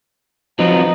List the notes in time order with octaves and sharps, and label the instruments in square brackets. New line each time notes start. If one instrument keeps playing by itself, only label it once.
[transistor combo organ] F3 [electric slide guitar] F#3 C4 B4 [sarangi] D#4